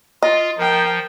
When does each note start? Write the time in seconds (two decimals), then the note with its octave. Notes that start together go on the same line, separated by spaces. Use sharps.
0.23 F4 D#5
0.58 F3 A#4 G5